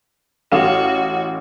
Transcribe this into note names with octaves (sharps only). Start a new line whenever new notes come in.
A1 F#4 F5 E7